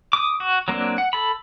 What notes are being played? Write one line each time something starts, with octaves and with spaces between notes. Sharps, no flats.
D6 D#6
F#4
F#3 A#3 C4 D4
F#5
A4 B5